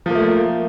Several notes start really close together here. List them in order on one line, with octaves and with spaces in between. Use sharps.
F3 A#3 A3